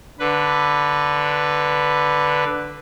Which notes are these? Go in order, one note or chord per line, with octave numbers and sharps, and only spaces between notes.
D3 B4